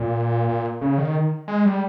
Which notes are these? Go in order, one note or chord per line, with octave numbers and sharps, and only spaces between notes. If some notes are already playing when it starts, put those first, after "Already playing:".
Already playing: A#2
A#2
C#3
D#3
G#3
G3